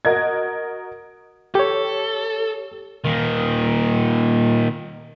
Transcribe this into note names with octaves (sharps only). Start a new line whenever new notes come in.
F#4 A#4 D#5 G#6
G4 A4 C#5
A#2 D#3